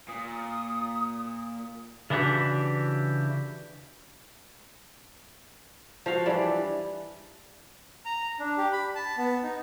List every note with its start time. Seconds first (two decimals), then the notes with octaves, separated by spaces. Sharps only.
0.08 A#2 D#6
2.10 C#3 E3 D4 F#4 G4
6.06 F3 F#4 F5
6.26 E3 G3 D4 D5
8.06 A#5
8.40 D4
8.58 G4
8.72 B5
8.95 A5
9.17 B3
9.43 D#4